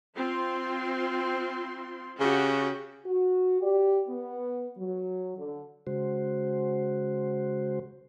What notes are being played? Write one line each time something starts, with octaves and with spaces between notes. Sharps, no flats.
C4 F4 C6
C#3 F#4 G4
F#4
G4 D5
B3
F#3
D3
C#3 G#3 F#4 C5